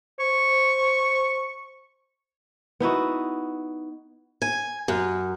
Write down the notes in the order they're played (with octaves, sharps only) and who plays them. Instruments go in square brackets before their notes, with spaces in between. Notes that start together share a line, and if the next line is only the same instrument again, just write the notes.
[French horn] C5 [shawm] C#6
[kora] B3 D#4 E4 F#4
[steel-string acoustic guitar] G#5
F#2